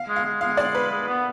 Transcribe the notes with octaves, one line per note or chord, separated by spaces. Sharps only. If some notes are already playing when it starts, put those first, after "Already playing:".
Already playing: F5
G#3
F5
G#3
G#3 F5
D5
B4
G#3
B3